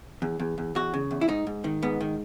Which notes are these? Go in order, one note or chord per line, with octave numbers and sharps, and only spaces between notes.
E2
E2
E2
E2 F#4
C#3
E2
E4
G#2 D#4
G#2
D#3
G#2 B3
D#3